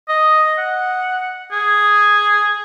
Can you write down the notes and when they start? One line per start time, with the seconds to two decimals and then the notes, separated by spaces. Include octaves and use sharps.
0.09 D#5
0.58 F#5
1.52 G#4